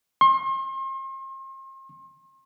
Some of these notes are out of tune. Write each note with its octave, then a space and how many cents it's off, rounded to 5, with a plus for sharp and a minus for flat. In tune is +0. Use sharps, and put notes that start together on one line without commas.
C6 +40